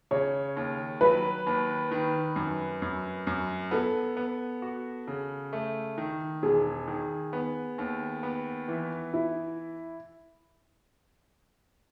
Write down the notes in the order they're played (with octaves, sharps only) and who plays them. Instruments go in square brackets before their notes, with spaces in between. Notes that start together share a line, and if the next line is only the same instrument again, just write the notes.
[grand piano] C#3 [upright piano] C#5
[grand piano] D#2
[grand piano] F#3 [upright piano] B4
[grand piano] D#2
D#3
F#2
F#2
F#2
[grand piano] B3 [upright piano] A4
[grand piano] B3
F#4
C#3
A3
D#3
[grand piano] E1 [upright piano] G#4
[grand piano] D#3
B3
D#2
B3
E3
[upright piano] E4